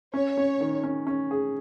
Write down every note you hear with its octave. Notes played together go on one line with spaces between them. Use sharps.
C#4 C#5
C#4
D#3
C#4
C#4
G#4